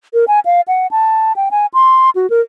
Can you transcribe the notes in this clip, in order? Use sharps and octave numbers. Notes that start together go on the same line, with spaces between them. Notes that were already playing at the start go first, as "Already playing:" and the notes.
A#4
G#5
F5
F#5
A5
G5
G#5
C6
F#4
A#4